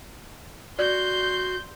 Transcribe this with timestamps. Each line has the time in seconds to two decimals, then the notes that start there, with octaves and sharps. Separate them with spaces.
0.79 F#4 D5 C6 G6